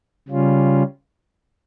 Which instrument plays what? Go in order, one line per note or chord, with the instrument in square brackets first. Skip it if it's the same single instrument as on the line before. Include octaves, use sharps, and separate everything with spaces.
[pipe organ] C#3 G3 C#4 F4